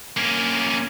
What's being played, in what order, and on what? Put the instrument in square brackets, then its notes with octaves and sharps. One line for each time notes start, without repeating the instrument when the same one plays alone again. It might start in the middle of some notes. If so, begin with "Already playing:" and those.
[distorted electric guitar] A#3 C#4